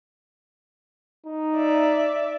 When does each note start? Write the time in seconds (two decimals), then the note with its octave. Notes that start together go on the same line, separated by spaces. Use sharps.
1.26 D#4
1.56 D5 E5